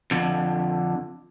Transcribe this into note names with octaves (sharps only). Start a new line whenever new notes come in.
F2 D3